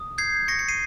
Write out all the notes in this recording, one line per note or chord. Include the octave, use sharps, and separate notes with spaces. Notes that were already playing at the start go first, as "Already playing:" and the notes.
Already playing: D#6
G6 G#6 C7
C#6 A#6 C#7
C#7
C7 D#7